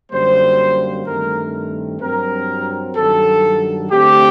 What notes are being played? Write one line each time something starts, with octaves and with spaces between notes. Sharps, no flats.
F#2 D3 G3 A#3 C5
G2 D#3 A3 C4 A#4
G2 F#3 C4 A#4
G2 D#3 F#3 A4
D3 A3 C4 G4